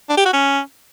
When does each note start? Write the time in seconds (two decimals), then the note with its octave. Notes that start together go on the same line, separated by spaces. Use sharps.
0.09 D4
0.17 G4
0.25 F#4
0.33 C#4